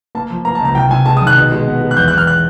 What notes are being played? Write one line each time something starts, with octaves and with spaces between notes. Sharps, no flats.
A#3 A5
F3
A#3 A#5
A5
C#2 A#5
C2 G5
C2 G#5
G#3 A5
D#6
D#3
F#6
B2
G#3
B3
G#3
F#6
E2 G6
F#6
E2
F6
F#6